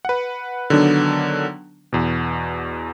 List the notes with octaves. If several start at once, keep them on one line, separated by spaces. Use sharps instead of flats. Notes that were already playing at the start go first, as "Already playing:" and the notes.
B4 F#5
D3 D#3 F#3 B3 D4
E2 B2